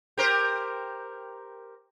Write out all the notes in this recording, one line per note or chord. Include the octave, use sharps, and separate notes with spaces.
G4 A#4 C5